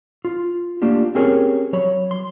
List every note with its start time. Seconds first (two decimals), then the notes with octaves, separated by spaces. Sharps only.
0.25 F4
0.82 A3 A#3 D4 F4 G4
1.15 C4 C#4 G4 G#4 A#4 C#5
1.73 F#3 C#5 B5
2.11 C6